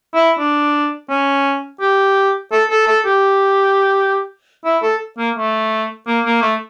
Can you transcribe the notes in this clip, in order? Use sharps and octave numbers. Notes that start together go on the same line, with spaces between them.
E4
D4
C#4
G4
A4
A4
A4
G4
E4
A4
A#3
A3
A#3
A#3
A3